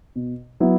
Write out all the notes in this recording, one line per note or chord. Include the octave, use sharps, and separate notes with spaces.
B2
F#3 B3 E4